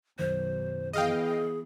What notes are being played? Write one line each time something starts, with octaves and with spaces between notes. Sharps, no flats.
B1 F#2 D#3 C5
E3 B3 G#4 D#5 F5 G5